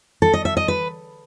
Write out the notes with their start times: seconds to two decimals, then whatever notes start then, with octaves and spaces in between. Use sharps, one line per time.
0.22 A4
0.33 D#5
0.45 E5
0.57 D#5
0.68 B4